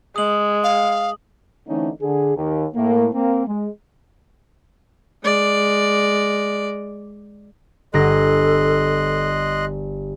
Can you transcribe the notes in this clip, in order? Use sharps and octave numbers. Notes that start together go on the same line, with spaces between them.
G#3 D#6 F#7
F5
D3 E3 A3 C4 C#4 D#4
D3 G#4
D#2
A2 A#3
A#3 C4
G#3
G#3 D5
G1 A4 D#5 C6 F#6 A#6